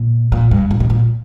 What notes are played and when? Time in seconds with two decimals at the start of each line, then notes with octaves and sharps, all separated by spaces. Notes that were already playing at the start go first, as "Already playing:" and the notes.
Already playing: A#2
0.32 A#2
0.51 G2
0.71 A#2
0.80 B2
0.90 A#2